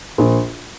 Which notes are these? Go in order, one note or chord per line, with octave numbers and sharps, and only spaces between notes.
A#1